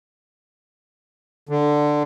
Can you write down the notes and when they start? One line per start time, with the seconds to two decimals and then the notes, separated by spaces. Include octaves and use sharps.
1.49 D3